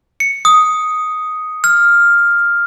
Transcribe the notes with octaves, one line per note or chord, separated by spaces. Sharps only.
C#7
D#6
F6